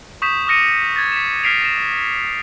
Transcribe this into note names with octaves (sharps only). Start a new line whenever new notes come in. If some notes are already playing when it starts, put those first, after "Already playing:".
C#6 D#6 G6 B6 E7
D6 D#6 F6 A#6 C#7 D#7
G#6 A6
B6 E7
F6 G#6 B6 C7 D7 F7
A#6 E7